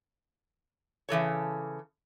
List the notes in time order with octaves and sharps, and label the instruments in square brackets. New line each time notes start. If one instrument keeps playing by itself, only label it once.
[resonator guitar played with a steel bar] C#3 E3 A4 C#5